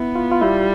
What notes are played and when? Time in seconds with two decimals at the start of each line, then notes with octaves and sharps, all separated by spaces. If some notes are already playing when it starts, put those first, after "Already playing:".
Already playing: B3 E4
0.16 F4
0.32 F4
0.41 G3 E4